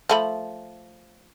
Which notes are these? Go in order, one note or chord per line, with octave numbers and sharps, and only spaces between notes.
F3 A3 B5